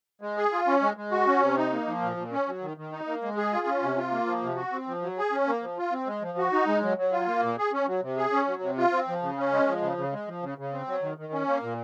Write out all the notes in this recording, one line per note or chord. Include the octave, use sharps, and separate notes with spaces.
G#3
G#4
F4
C#4
G#3
G#3
F#4
C#4
C3
D#4
A#3
F3
A#2
A#2
C#4
F#3
D#3
D#3
D#4
A#3
G#3
G#4
F4
C#4
C3
F4
A#3
F3
C3
F#4
C4
F3
F#3
G#4
C#4
A#3
F3
F4
C4
G#3
F3
F#4
D#4
G#3
F#3
F#3
F4
A#3
A#2
G#4
C#4
F#3
C3
G#4
C#4
F#3
C3
F4
C4
F3
C#3
C#4
G#3
F3
C#3
C#3
G#3
F3
C#3
C#3
C4
F#3
D#3
D#3
C#4
A#3
A#2